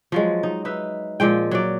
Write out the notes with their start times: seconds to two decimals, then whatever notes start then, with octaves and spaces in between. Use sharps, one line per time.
0.12 F3 F#3 G#3
0.43 D#4
0.65 D#4 B4 E5
1.20 A#2 F3 G#3 G5
1.51 F#3 D5